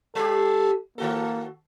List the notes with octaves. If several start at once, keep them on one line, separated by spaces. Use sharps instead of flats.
G3 G4 A4
D#3 A#3 F#4 A4